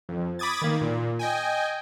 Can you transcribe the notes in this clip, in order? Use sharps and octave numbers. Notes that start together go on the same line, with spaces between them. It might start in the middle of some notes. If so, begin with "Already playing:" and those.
F2
B5 D6 D#6 G#6 A6
D#3 A#3
A#2
D#5 G5 G#5